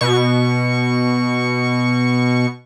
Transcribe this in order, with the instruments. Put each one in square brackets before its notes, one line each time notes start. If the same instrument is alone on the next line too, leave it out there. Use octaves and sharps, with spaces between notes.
[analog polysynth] B2 C#6